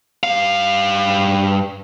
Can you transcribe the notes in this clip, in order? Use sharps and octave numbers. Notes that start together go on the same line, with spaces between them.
G2 F5